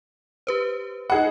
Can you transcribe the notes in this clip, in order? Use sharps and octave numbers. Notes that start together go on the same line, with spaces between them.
G4 B4 C5
D#4 G#4 F#5 B5